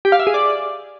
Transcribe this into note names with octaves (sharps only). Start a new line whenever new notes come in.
G4
F5
E5
G#4
D5